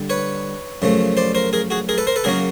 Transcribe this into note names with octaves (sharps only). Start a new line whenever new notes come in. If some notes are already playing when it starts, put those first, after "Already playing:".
Already playing: D3 G3
B4 C#5
F#2 C#3 F3 A3
C5 D5
A#4 C5
G#4 A#4
F#4 G#4
G#4 A#4
A4 B4
A#4 C5
A4 B4
C#3 F#3 A#3 C#4 G#4 A#4